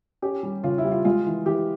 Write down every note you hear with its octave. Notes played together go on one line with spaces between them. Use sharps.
C#4 G4
G3
C#3 F4
E4
G3
F4
G#3 F4
E3
E3 G4